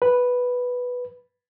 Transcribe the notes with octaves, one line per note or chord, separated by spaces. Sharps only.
B4